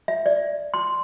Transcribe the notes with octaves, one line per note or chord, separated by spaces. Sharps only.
E5
D5
C6